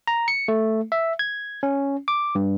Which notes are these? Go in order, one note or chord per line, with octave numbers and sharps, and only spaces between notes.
A#5
C#7
A3
E5
G#6
C#4
D6
G2